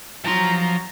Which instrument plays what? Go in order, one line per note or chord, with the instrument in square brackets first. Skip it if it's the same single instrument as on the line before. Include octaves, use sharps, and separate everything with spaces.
[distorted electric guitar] F3 C6 [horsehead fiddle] F#3 A#5